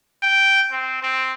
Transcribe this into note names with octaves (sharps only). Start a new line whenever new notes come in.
G5
C4
C4